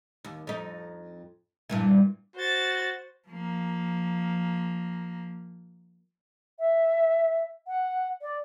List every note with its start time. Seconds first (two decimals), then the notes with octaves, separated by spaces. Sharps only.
0.24 D#2
0.47 F2 D#4
1.70 G2 A#2 E3
2.36 F#4 C5 A6
3.28 F3 A#3
6.59 E5
7.68 F#5
8.22 D5